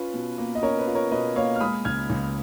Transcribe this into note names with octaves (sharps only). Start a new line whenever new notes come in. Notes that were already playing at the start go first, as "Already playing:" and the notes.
Already playing: C#4 F4 B4
B2
A#3
D#5
C#4 A#4 C#5
B4
F4
A#4 C#5
B2 B4 D#5
A#3 C#5 F5
F6
G#3 B5 D#6
C#2 F6 G#6
C#2